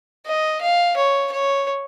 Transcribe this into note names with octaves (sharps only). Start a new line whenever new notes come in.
D#5
F5
C#5
C#5